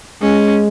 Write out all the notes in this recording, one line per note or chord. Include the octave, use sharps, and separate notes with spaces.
G#3 C#4